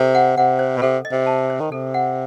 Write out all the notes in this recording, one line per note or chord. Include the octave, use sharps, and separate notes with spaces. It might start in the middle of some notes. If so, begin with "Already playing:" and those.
Already playing: C3 A4
F#5
C3 F#5
C5
B2
C3 A4
D#5
C3
A5
C5
D#3
C3 A4
F#5